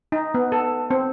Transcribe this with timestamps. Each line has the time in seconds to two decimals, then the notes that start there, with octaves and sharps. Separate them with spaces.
0.12 D#4
0.34 B3
0.52 A4
0.90 C4